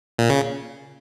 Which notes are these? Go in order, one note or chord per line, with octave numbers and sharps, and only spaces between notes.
A#2
C#3